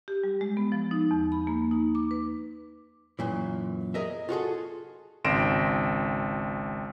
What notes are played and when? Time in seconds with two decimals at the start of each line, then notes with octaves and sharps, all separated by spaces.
0.08 G4
0.24 G3
0.41 G#3
0.57 B3
0.72 F3
0.91 D#4
1.11 E2
1.32 B5
1.47 A#3
1.71 D#4
1.95 D6
2.11 B4
3.19 F#2 A#2 E3
3.94 G#4 A#4 D#5 E5
4.29 F4 F#4 G#4 A4
5.24 G#1 C#2 C6 A#6 D7 E7